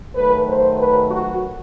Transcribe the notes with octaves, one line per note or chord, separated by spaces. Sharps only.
D#3 F#3 A3 B4
C5
B4
F#4